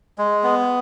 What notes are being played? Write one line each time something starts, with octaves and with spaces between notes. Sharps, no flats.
G#3
B3